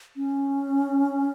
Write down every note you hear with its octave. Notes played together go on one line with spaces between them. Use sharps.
C#4